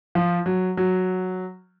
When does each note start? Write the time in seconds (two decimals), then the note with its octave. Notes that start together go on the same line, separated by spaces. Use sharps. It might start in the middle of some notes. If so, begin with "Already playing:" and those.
0.15 F3
0.46 F#3
0.77 F#3